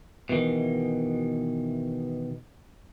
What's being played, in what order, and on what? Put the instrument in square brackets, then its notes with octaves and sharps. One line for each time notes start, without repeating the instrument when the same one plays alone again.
[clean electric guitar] B2 D#3 E3